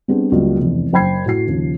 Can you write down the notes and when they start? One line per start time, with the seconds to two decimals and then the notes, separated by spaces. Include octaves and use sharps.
0.08 G3 B3 C4 D4 G#4
0.32 C#2 F#3 G3 A#3
0.60 F1 E2
0.93 F#1 C5 G5 B5 G#6 C7
1.26 A2 F#4 C7
1.47 D#2 C#3 F3